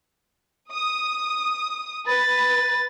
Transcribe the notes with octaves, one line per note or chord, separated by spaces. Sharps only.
D#6
B4 A6